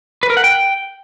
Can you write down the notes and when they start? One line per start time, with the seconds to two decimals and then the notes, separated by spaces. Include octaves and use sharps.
0.23 B4
0.30 A#4
0.37 F#5
0.44 G5